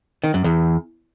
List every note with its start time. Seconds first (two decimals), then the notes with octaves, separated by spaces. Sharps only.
0.24 D#3
0.34 F#2
0.44 E2